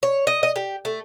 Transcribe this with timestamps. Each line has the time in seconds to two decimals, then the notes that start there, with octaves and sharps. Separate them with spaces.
0.03 C#5
0.27 D#5
0.43 D#5
0.56 G4
0.85 A3